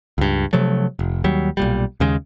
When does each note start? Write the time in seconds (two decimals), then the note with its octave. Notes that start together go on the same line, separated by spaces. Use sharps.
0.18 C#2 G2
0.53 C3 F3 F#3 A3
0.99 F1
1.24 D#2 F#3 G3
1.57 B1 A#2 G3
2.00 D#2 C#3 G#3